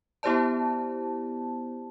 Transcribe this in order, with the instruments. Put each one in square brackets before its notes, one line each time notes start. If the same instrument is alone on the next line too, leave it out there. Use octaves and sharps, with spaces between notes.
[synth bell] B3 E4 G4 C5 D5 A5